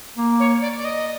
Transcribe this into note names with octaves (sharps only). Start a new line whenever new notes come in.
A#3
C#5
D5
D5
D#5